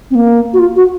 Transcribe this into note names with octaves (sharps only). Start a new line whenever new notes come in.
C4
A#3
F#4
F4
F#4